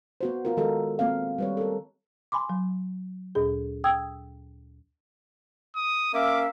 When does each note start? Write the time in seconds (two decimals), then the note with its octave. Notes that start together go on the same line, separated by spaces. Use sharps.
0.21 B3 F#4 C5
0.45 B3 F4 A#4
0.57 D#3 G#3 F#4 A4 A#4
0.99 A#3 C4 F5
1.38 G3 B4 C#5
1.57 A4 A#4
2.32 G#5 B5 C6 D6
2.50 F#3
3.35 D2 A#2 G#4
3.84 G5 D#6 E6 G#6
5.75 D#6
6.14 A#3 C#4 E5 D6